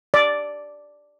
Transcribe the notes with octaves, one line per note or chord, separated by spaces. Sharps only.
D5